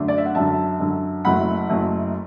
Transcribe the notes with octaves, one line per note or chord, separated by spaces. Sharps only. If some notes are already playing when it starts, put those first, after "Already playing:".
Already playing: F#2 D3 A3 D4
D5
E5
F#5
F#2 D3 F#3 E5 A5
F#2 D3 F#3
F#1 F#2 F#3 A3 E4 F#5 B5
F#1 F#2 F#3 A3 E4